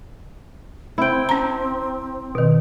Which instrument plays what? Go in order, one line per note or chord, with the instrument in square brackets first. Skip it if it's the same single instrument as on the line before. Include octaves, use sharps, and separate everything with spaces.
[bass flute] C4 [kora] E4 G5
[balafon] C#4 A#5
[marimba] B2 D#3